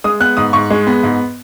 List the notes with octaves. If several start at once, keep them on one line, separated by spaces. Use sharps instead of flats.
G#3 D#6
B3 F#6
G#2 D#6
G#2 C#6
G#3
B3
G#2